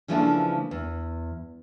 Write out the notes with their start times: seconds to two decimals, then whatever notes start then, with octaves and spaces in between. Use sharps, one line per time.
0.08 C#3 E3 F3 A3 A#3 D4
0.71 E2